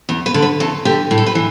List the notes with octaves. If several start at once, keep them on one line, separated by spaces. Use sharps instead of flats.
E2
B4
D3
B4
E2 A4
D3 G4
A2
A4
B4
E3